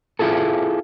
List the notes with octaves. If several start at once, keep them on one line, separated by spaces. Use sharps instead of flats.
E4 F4 G#4 A4